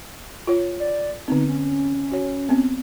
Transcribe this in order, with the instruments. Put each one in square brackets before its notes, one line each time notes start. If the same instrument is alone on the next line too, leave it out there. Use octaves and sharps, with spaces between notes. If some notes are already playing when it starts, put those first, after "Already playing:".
[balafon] F4 C#5
[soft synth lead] D5
[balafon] D3 B3 C4 [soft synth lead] D#4
[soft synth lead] C#4
[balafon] F#4 C#5
B3 C4